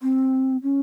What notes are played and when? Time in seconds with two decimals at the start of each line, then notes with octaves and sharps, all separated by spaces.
0.03 C4
0.63 C#4